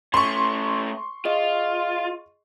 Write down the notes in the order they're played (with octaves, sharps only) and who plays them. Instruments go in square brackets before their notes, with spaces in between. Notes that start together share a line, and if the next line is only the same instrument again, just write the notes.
[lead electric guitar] A3 C#4 [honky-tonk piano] C6 C#6
[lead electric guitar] F4 [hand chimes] G#4 D#5